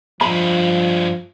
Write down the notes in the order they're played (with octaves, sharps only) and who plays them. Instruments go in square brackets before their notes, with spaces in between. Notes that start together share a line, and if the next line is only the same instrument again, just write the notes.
[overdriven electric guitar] G2 G#3 [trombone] F3 [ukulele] B5